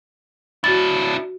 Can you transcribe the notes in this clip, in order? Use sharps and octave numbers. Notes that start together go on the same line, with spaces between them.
D4 E4 F#4 A6